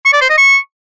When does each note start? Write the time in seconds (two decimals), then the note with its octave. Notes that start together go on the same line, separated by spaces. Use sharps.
0.05 C#6
0.13 D5
0.21 C5
0.30 D#5
0.38 C#6